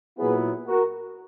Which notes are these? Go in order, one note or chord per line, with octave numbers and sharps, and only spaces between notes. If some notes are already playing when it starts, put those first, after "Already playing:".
A#2 F#3 B3 E4 G#4 B4
F#4 A#4